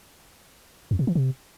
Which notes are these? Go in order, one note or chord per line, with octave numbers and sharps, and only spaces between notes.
F2
B2
E3
C3